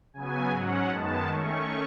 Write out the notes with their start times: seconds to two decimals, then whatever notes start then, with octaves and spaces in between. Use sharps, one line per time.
0.14 C#3 F#3 B3 G#5
0.51 G#2 F#3 C#4 F#5
0.89 F#2 D#3 G#3 B3 A5
1.28 D#3 A3 C#4 C#6